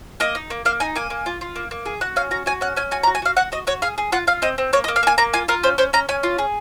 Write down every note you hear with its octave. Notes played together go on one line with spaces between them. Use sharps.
A#3 D#5
D#4
A#3
A#3 F5
D#4 G#5
A#3 G#5
A#3
F4
F4
A#3
A#3
G#4
F#4 F#5
C#4 F5
F#4 A#5
F#4 G#5
C#4 F#5
C#4 G#5
F#4 G#5
A#5
F#4
G#5
F#4 F5
F#4 F#5
F#4 D#5
F#4 C#5
G#4 F5
G#4
F4 F#5
F4 F5
C4 D#5
C4
A#3 C#5
D#5
A#3
F5
A#3 G#5
A#3 A#5
F4 G#5
F4 A#4
C#4 C5
C#4 C5
C#4 A#5
C#4 G#5
F4
G#4